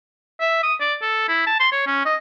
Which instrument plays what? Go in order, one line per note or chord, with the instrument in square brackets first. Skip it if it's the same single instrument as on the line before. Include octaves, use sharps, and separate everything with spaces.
[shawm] E5
D#6
D5
A4
E4
A5
C6
C#5
C#4
D#5